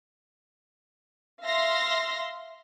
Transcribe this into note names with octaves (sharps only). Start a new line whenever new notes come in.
E5 F5 C6 A#6